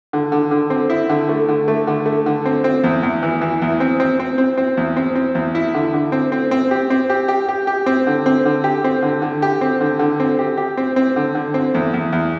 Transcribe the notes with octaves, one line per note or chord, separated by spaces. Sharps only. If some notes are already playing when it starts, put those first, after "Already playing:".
D3
D3
D3
C4
E4
D3
A3
D3
A3
D3
A3
D3
C4
C4
E2
E2
E3
E3
E2
C4
C4
C4
C4
C4
E2
C4
C4
E2
E4
D3
D3
C4
C4
C4
G4
C4
G4
G4
G4
G4
C4
D3
C4
D3
G4
C4
D3
D3
G4
C4
D3
D3
C4
G4
G4
C4
C4
D3
D3
C4
E2
E2
E2